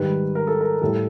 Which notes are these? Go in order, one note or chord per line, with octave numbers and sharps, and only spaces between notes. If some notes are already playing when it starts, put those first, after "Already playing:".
Already playing: G#2 D#3 G3 B4
A#4
A4
A#4
A2 E3 G3 A4